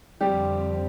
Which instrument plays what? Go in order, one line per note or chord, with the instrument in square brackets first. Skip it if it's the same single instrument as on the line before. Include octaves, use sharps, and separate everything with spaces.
[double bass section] F2 D3 F3 C4 [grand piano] G3 G4